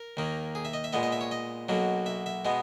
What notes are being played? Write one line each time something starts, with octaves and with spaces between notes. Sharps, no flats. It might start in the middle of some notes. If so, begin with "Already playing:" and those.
Already playing: A#4
D#2 D#3 A#3
G#4
E5
D#5
E5
A#2 G#3 B3 D#5
D#5
E5
C#5
D#5
B1 B2 F#3 A#3
E5
E5
B2 G#3 B3